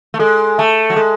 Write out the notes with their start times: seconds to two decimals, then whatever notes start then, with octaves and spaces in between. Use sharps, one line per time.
0.14 A3
0.19 G#3 A4
0.58 A3 E5 A5
0.90 F#3
0.96 G#3 A4